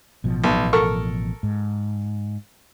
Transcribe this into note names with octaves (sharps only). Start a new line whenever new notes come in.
A1 B2 F3
B1
A4 A#4 C#6
G#2